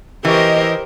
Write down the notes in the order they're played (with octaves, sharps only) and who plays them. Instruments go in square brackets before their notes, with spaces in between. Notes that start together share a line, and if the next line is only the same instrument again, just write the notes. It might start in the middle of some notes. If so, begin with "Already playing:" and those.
[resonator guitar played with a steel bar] E3 [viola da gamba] G4 A#4 C5 [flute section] D#5